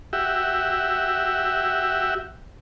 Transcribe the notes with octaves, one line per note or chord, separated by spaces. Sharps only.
F#4 G4 E5